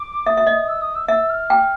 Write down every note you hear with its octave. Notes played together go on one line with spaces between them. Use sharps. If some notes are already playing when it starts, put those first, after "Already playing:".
Already playing: D6
E5 D#6
E5
D#5
E6
D#6
E6
E5 E6
F6
G5